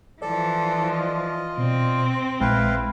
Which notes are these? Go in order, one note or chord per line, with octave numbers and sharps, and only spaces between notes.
E3 F3 A4 D5
F4 D#5
B2 C4
A#1 G#3 E4 B4 F5 G5